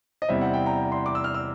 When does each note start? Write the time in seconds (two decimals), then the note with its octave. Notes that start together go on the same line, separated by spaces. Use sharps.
0.22 D#5
0.29 E2 C3 E3 G3 C4 E5
0.41 F#5
0.54 G5
0.66 A#5
0.92 C6
1.06 D6
1.15 E6
1.24 F6
1.34 E6